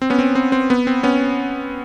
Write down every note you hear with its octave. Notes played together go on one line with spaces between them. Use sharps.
C4
B3 C#4
C4
C4
C4
B3
C4
B3 C#4